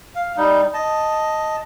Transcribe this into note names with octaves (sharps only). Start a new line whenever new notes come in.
F5
G3 D#4
D#5 A5